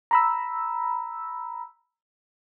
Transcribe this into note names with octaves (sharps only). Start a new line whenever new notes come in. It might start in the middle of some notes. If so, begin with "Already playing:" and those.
A#5 B5 E6